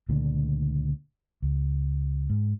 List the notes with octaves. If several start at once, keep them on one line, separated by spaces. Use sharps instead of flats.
C#2 A#2 D3 A3
C#2
G#2